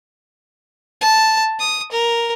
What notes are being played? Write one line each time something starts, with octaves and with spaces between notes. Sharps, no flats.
A5
D#6
A#4